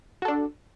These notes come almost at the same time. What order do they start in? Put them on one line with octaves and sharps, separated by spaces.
F#4 A4 D4